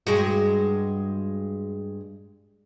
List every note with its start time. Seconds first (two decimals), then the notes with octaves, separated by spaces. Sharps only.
0.07 G2 G#3 F#4